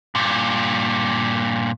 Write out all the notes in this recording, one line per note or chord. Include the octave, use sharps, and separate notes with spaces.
G2 A#2